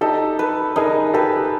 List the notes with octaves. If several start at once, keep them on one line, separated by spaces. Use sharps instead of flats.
D#4 G4 A4
B4
D#4 G#4 A#4
G4 A4 B4